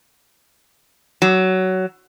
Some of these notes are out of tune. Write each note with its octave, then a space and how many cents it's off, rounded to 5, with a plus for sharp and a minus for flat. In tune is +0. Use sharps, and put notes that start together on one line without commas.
F#3 +15